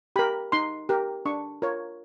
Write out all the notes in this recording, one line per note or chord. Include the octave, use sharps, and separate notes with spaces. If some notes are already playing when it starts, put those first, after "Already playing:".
G4 A#4 B5
D#4 C6
G4 A#4
D4 C#6
F4 A#4 C#5